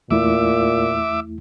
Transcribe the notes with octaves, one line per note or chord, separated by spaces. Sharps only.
E2 A#2 A3 E4 E5 D6